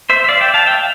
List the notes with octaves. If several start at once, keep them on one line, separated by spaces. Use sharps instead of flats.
C5 E5
E5
D5 F5
E5 G5
F5 A5
E5 G5
F5